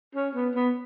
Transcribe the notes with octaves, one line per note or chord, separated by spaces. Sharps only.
C#4
B3
B3